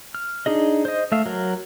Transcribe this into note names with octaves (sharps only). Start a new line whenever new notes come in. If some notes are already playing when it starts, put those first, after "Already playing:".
F6
D4 D#4 G#4 D#5
C5 D#5
A3 E5 F5
F#3 A#4